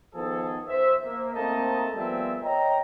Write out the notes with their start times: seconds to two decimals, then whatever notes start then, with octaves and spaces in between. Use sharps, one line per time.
0.15 D#3 F3 B3 G#4 A4
0.67 C5 E5
1.04 A#3
1.34 A3 A#3 C4 D#4 D#5 A5
1.95 F3 G3 B3 C4 G#4 E5
2.43 C#5 D#5 G5 A#5